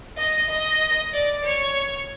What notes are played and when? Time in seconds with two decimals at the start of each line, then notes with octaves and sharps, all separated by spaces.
0.18 D#5
0.50 D#5
1.13 D5
1.45 C#5